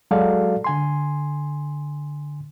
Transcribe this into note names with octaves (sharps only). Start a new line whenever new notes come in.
F#3 G#3 F#4 A4 D5 F5
D3 G#5 C6